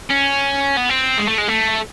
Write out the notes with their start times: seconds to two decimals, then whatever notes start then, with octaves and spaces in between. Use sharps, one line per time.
0.10 C#4
0.77 B3
0.90 C4
1.18 G#3
1.28 A3
1.38 G#3
1.48 A3